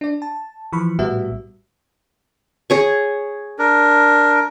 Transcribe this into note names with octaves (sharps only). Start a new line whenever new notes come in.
D4 D5
A5
E3 F3 B5 C#6
A#1 A2 G3 B3 F#4 E5
G#4 C#5 C#6
D4 A#4